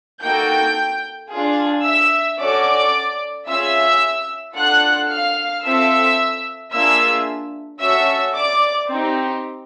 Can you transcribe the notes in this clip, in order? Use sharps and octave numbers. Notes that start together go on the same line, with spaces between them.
A#3 D#4 F#4 A4 G5 G6
D4 F4 G#4
E5 E6
C#4 F#4 A4 D5 D6
C#4 F4 G#4 E5 E6
D4 F4 A4 F#5 F#6
F5 F6
C4 F4 A4 E5 E6
A#3 D4 F4 G#4 E5 E6
C#4 F#4 A4 E5 E6
D5 D6
C4 D#4 G4